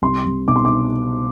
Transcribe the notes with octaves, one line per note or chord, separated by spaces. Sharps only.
C2 C6
C2
B2 D6
C6
D6